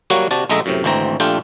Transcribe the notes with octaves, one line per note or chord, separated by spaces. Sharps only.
F#3 G3 A#3 F#4 C#5 F#5
C3 F#4 D5 A5
A#1 G#3 A3 D#5 E5 A#5
F#2 A2 C3
G#1 D2 E3 C4 A#5
A#1 A3 D4 F4 G4 G5